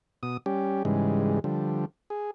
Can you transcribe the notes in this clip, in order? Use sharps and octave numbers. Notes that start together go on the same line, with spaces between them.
B2 D#6
G3 C#4 G4
G#2 C#3 E3 G3 G#3
D3 F3 G3
G#4